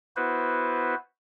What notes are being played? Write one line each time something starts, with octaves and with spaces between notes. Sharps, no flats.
B3 E4 F#4 B4 C5